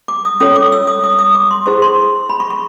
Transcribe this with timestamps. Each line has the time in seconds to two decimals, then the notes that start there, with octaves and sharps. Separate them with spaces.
0.08 D6
0.25 D#6
0.40 C#4 F4 A4 C#5 D#6
0.56 D6
0.72 E6
0.87 D#6
1.04 D#6
1.19 D#6
1.35 D6
1.51 C6
1.66 E4 G#4 C5 C#6
1.82 C6
2.29 B5
2.40 C#6
2.50 C#6